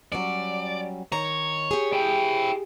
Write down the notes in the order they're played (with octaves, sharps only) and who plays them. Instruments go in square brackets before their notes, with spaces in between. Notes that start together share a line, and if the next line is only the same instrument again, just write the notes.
[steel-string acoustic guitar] F#3 G3 C#4 [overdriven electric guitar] D5
[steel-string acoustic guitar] D#3 A#5 [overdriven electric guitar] C#5
[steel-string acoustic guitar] G4 G#4
[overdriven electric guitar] E4 G5